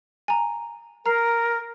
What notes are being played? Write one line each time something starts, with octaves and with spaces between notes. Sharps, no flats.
G#5 A#5
A#4 A#5 F6 C7